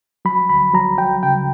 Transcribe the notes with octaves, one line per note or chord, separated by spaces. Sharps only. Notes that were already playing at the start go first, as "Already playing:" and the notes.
F#3 B5
D2 B5
F#3 A#5
F#3 G5
C#3 G5